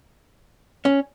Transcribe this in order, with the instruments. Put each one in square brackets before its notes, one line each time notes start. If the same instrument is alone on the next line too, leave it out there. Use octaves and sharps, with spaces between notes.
[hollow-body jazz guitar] C#4